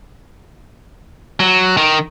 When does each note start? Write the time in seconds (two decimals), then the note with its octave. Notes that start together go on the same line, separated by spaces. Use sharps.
1.40 F#3
1.77 D#3